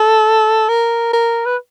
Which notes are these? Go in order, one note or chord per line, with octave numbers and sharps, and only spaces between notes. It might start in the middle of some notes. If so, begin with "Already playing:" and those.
Already playing: A4
A#4
A#4
B4